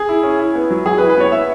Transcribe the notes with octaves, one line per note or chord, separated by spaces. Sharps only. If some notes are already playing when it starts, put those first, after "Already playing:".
Already playing: G#4
E4
C#4
E4
B3
F#3
F#3 G#4
B4
E4
B4
B3 C#5
B3 E5